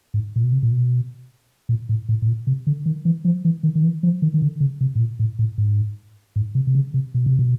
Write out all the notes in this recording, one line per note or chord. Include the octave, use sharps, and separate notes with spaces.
G#2
A#2
B2
C3
A#2
B2
A#2
A2
A2
A2
A#2
C3
D3
D#3
E3
F3
E3
D#3
D#3
E3
F3
D#3
D#3
D3
C#3
C3
A2
A#2
A2
A2
G#2
G#2
C3
C3
C#3
C3
B2
C3
B2